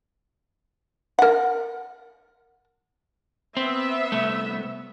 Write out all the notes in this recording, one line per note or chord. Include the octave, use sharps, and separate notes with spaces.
A#4 F#5
B3 C4 E5
C2 A3